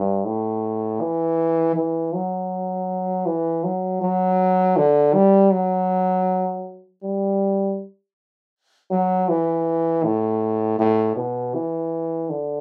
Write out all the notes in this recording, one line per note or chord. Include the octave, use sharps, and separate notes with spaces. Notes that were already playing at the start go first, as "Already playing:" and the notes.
Already playing: G2
A2
E3
E3
F#3
E3
F#3
F#3
D3
G3
F#3
G3
F#3
E3
A2
A2
B2
E3
D3